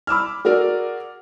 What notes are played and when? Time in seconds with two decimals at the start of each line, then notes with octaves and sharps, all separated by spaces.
0.07 B5 D6 E6 F6
0.45 F#4 G#4 A#4 D5